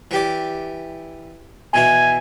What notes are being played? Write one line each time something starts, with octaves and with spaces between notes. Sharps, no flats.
E3 G4 D5
B2 E3 E4 G#5